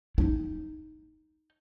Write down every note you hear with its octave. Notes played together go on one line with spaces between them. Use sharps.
D#4 E4